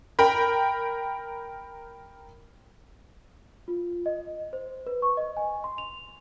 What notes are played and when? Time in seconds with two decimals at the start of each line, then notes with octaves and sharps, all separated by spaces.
0.19 A#4 G5 B5
3.68 F4
4.06 D#5
4.53 C5
4.87 B4
5.02 C#6
5.17 D#5
5.37 G#5
5.64 C6
5.78 F7